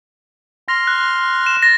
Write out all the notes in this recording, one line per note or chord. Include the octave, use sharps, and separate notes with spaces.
C6 F6 A#6
F#6
E7
A6 A#6